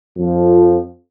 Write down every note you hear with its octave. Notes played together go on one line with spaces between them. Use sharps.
F2 F3